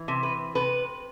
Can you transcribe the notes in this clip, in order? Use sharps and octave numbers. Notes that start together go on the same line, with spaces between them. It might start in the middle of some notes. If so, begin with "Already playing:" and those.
Already playing: E3
C3
B4
C3 B4